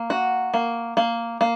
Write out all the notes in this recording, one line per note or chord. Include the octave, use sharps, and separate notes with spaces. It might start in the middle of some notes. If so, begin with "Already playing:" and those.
Already playing: A#3
F#4
A#3
A#3
A#3